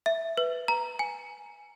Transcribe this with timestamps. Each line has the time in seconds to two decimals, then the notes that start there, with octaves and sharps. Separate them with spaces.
0.06 E5
0.37 B4
0.68 A#5
0.99 G#5